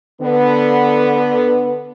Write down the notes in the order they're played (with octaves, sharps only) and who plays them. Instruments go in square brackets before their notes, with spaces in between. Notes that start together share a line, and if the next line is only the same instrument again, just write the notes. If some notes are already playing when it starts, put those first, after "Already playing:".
[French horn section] D3 B3